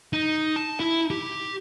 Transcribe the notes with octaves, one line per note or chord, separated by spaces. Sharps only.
D#4
A5
E4
G4